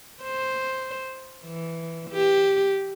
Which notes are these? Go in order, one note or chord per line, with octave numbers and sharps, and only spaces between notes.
C5
E3
G4